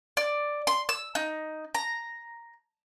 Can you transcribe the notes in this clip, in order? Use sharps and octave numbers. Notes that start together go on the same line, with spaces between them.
D5
C6
E6
D#4
A#5